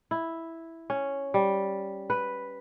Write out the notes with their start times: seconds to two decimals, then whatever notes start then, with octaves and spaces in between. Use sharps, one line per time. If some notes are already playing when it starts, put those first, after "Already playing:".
0.11 E4
0.90 C#4
1.34 G3
2.10 B4